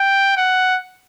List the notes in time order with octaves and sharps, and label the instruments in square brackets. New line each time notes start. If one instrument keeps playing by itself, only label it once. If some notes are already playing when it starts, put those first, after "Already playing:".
Already playing: [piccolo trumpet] G5
F#5